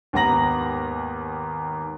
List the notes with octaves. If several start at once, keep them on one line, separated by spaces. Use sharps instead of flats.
D#2 G#2 B3 A#5 A#6 F#7